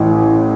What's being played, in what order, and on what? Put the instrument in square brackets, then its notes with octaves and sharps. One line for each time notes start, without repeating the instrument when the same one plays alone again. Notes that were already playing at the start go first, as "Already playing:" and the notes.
Already playing: [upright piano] A1 A2 E3